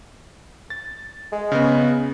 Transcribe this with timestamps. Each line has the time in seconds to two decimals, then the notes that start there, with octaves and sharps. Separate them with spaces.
0.70 A6
1.33 G#3
1.52 C#3 B3